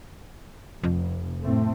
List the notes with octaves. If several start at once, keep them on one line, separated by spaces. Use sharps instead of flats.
F1 F2
A2 A3 C4